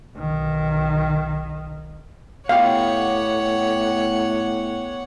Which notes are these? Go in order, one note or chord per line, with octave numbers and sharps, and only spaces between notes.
B1 D#3
A2 B3 G4 C#5 F5 F#5